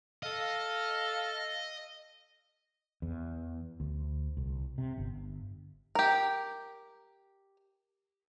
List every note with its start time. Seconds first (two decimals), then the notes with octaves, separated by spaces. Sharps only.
0.23 A4 D#5 F5
3.02 E2
3.80 D2
4.37 C2
4.78 C3
4.98 G1
5.95 G4 A#4